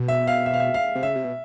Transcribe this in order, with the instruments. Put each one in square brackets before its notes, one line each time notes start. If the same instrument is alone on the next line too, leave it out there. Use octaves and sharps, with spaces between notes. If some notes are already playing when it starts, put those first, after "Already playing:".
Already playing: [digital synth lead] B2
[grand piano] E5
F5
E5
F5
E5
F5
[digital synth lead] C3
[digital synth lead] C#3 [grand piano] E5
[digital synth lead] C3
B2